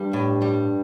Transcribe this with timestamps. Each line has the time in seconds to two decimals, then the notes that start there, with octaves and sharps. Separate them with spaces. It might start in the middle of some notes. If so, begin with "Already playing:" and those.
Already playing: G2 G3
0.13 A2
0.42 G3